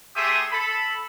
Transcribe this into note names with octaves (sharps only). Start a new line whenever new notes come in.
A3 G4 G#4 E5 C6 D#6
A4 B5